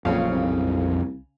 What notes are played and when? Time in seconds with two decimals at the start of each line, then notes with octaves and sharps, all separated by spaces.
0.05 A#1 F2 A#2 C#3 F#3 C#4 F5
0.31 C2